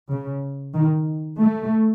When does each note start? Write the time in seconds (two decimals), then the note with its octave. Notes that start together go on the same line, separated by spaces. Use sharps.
0.10 C#3
0.75 D#3
1.38 A3